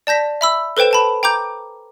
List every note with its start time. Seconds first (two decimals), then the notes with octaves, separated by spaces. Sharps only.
0.07 D5 A5 G6 A#6 B6
0.41 E5 B5 E6
0.77 A4 B4 C5 G5 E7
0.91 G5 A5 B5
1.23 G5 A#5 D6 G6